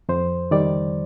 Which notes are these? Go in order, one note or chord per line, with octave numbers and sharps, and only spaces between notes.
F2 C5
D#3 G3 D5